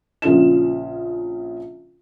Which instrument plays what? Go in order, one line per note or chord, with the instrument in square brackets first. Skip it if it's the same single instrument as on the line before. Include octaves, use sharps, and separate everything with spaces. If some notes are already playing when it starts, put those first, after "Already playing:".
[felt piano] A#1 C#3 F4 E7